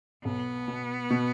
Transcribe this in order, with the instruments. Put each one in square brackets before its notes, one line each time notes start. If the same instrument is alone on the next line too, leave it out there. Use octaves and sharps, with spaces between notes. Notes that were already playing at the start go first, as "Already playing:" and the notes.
[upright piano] B1 [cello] B3
[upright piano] B2
B2